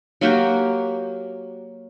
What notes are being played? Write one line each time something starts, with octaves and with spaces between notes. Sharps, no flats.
F#3 A#3 F#4 G4